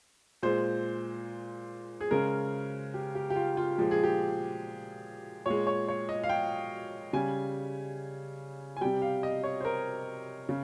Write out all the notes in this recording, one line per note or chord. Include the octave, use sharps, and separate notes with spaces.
A#2 G#3 C5
G#4
C#3 G#3 A#4
G4
G4
G4
F4
F4
A#2 F3 G#3 G4
G#4
G4
A#2 G#3 C#5
C#5
C#5
D#5
F5
G5
C#3 G3 G#5
G#5
C3 G3 G5
F5
D#5
C#5
C5
A#4
C#3